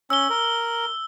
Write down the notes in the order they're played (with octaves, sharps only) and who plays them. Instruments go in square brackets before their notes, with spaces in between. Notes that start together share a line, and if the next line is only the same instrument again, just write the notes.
[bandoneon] C#4 [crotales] E6 G7
[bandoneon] A#4